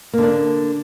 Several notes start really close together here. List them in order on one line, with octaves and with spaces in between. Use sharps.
A#3 D3 D4